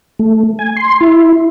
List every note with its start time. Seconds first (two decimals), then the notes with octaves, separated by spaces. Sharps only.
0.19 A3
0.59 G#5
0.77 C6
1.01 E4